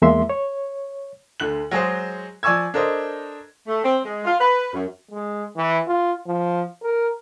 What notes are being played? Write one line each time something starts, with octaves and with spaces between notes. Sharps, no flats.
E2 G#3 A#3 E5 C6
C#5
D2 D3 F#6 F#7
F#3 G#3 F#4 G#4 C5
F3 D5 G#5 C#6 E6 G#6
D4 A4 A#4 C5 D#5
A3
C4
G#3
F4
B4
F#2
G#3
E3
F4
F3
A#4